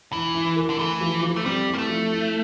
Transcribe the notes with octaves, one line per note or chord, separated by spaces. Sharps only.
E3 E4
E4
A#4
D3
E3 A3
F3
F3
A3
G3 C4
E4
A#3
A3
F3
E4